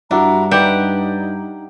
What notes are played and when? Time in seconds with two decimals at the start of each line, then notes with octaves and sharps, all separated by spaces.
0.11 G2 D4 E4 F#4 A#5
0.51 D#4 G4 B4 D5 E5 F#5 G6